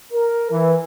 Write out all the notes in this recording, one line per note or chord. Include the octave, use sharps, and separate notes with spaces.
A#4
E3